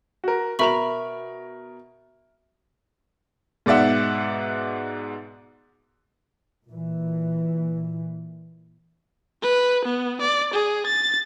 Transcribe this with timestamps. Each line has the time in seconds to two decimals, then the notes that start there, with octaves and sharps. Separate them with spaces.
0.24 F#4 A#4
0.59 B2 A#4 E5 B5 C#6 F7
3.66 G#2 B2 D5 E5 F#5
6.68 A#2 E3
9.42 B4
9.85 B3
10.21 D5
10.54 G#4
10.86 A6